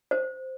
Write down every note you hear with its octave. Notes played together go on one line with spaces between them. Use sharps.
C5